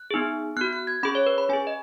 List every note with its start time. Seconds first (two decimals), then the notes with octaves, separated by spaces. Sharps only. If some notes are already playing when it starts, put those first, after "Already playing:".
Already playing: F#6
0.11 B3 D#4 G#4
0.57 B3 F#4 F#6
0.73 F#6
0.87 G#6
1.03 C#4 G#4 B5
1.15 C#5
1.26 B4
1.38 B5
1.49 C#4 G#4 G#5
1.67 D#5